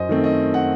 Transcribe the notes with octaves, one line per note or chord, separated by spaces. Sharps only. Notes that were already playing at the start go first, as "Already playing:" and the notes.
Already playing: F#2 C5 D#5
D#3 A3 C4
D#5
F#5